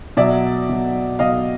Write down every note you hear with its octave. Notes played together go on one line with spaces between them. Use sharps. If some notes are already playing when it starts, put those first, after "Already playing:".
B2 F#3 D5 E5
B2 F#3
B2 F#3 D#5 F5